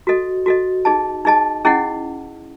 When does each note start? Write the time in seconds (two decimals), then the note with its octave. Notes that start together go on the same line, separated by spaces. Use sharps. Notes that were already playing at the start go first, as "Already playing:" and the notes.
0.07 F#4 A4 D#5
0.46 F#4 A4 D#5
0.85 D#4 G#4 D#5 A5
1.25 D#4 G#4 D#5 A5
1.65 C#4 E4 G#4 D#5 F#5